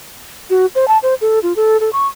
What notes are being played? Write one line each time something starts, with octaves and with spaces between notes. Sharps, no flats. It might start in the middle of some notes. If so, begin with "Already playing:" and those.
F#4
C5
A5
C5
A4
F4
A4
A4
C#6